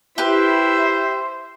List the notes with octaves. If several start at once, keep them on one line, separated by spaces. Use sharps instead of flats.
E4 G4 B4 C5 E5